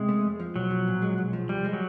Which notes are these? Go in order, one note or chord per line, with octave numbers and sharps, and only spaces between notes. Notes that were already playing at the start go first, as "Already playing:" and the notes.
Already playing: C3 G#3
A3
F2
F3
B1 F#3
F3
A#2
G#3
B1
F3
C2 G3
G#3
F#3